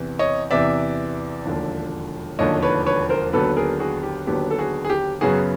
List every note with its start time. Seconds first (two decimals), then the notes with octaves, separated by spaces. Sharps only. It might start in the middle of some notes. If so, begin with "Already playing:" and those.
Already playing: E2 C3 E3
0.19 C#5 D#5
0.51 E2 C3 E3 D5 E5
1.46 E1 D#2 D3 F3
2.39 E1 D#2 D3 F3 C#5 D#5
2.63 B4 C#5
2.86 B4 C#5
3.09 A#4 C5
3.33 D#2 D3 F#3 B3 A4 B4
3.57 G#4 A#4
3.80 F#4 G#4
4.03 G4
4.27 D#2 D3 F#3 B3 G4
4.50 A4
4.59 F#4 G#4
4.85 G#4
4.90 G4
5.21 F#2 C#3 F#3 B3 F#4 G#4